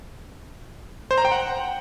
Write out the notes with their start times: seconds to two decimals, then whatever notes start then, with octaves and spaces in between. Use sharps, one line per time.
1.11 C5
1.18 A#5
1.25 G5
1.32 F#5